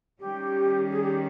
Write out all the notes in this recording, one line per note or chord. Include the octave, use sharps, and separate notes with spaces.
D#3 G3 C#4 G4
G#4
G4